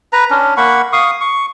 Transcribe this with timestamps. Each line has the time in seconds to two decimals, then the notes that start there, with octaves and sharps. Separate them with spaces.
0.13 B4 A#5
0.30 C#4 D4
0.57 A#3 F#5 B5 C#6
0.93 F5 C#6 D#6
1.21 C#6